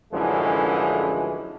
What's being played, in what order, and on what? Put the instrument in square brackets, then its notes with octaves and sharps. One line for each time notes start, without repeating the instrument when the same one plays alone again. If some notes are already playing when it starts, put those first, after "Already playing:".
[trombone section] A1 F#2 D3 E3 F3 G#3